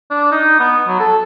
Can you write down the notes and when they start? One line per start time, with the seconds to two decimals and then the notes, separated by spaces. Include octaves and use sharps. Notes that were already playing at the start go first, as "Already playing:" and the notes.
0.11 D4
0.32 D#4
0.60 B3
0.88 F#3
1.00 A4